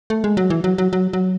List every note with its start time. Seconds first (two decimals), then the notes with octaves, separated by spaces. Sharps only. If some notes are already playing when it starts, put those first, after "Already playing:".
0.10 A3
0.24 G#3
0.37 F#3
0.50 E3
0.64 F#3
0.78 F#3
0.93 F#3
1.13 F#3